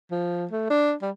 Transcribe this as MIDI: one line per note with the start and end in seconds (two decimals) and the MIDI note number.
0.11 0.46 53
0.51 0.67 57
0.70 0.93 62
1.02 1.10 55